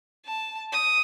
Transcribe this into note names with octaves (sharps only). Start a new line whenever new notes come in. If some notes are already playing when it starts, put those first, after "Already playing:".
A5
D#6